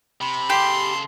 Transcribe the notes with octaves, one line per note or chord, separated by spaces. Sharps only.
C3 B5
C#3 G4 A4 C6